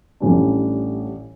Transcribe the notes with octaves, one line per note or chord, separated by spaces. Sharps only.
A1 A2 E3 G3 D4